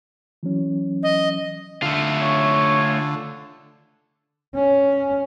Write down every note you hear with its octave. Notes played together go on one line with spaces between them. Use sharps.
E3 F#3 C#4
D#5
D3 A3 F4
C#5
C#4